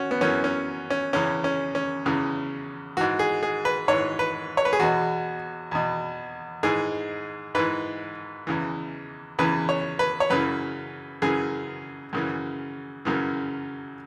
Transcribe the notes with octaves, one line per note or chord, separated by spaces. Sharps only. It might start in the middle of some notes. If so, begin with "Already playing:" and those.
Already playing: C#4 F#4
B3
F#2 E3 C#4
C#4
C#4
E2 C#3 E3 C#4
C#4
C#4
E2 C#3 E3
G#2 E3 F#4
G#4
G#4
B4
G#2 E3 C#5
B4
C#5
B4
G#4
E2 B2 F#4
E2 B2
G#2 E3 G#4
G#2 E3 B4
E2 C#3 E3
E2 C#3 E3 B4
C#5
B4
C#5
F#2 C#3 E3 B4
F#2 C#3 E3 G#4
F#2 C#3 E3
F#2 C#3 E3